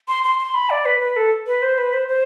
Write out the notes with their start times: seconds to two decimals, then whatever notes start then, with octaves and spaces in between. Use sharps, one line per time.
0.08 C6
0.24 C6
0.39 C6
0.54 B5
0.70 D5
0.85 B4
1.01 B4
1.16 A4
1.47 B4
1.62 C5
1.78 B4
1.93 C5
2.08 C5